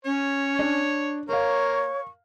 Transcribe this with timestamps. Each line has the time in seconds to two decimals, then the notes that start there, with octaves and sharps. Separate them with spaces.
0.05 C#4 C#5
0.59 D4
1.29 A#3 A#4 C#5 F5 C#6